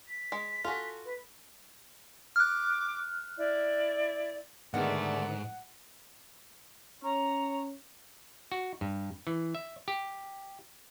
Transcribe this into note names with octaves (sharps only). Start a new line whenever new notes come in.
B6
G#3
F4 F#4 A4 G#5
B4
D6 F6 F#6
E4 D5
G#2 D3 D#3 A3 B3 G#4 D5 F#5
C#4 C#5 A#5
F#4
G2
E3
E5
G4